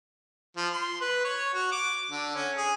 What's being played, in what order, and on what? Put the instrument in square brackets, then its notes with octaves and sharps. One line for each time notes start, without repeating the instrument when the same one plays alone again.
[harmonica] F3
C6
B4
C#5
F#4
D6
D3
C#4
G#4